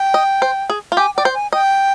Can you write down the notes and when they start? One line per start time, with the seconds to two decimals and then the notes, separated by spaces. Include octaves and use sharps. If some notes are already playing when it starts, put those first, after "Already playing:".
Already playing: G5
0.14 D#5
0.42 C5
0.70 G#4
0.92 F4
0.97 G4 G#5
1.15 D5 G5
1.25 C5
1.35 G#5
1.53 D#5 G5